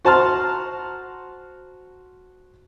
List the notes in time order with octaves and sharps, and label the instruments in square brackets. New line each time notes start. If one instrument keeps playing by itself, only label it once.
[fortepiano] F#4 C5 A5 A#5 C6 F6